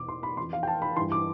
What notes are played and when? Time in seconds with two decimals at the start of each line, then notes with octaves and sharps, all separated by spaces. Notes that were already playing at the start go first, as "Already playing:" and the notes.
Already playing: E2 B2 D6
0.09 C6
0.23 B5
0.37 F2 E3 C6
0.53 F5
0.63 G5
0.67 A5
0.82 B5
0.96 G2 E3 C6
1.12 D6